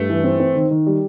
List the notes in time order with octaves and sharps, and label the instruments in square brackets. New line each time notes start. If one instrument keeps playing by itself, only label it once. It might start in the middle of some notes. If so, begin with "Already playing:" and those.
Already playing: [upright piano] G2 [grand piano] A3
[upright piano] E3
C4
C4
D#3
D#3
G3